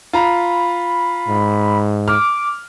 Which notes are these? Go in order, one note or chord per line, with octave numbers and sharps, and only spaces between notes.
F4 A#5 B5
G#2
D6 F6